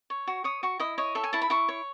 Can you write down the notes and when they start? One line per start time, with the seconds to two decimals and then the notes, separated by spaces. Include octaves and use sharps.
0.10 C#5
0.27 F#4
0.44 C#5 D#6
0.63 F#4 C#6
0.79 E4 D#5
0.98 C#5 D#5
1.15 A4 E5
1.24 G#5
1.33 E4 A5
1.42 B5
1.50 E4 C#6
1.69 C#5